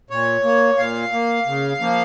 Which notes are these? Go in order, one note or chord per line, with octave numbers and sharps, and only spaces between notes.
A#2 C#5
A#3
A#2 F5
A#3
C#3
F3 A#3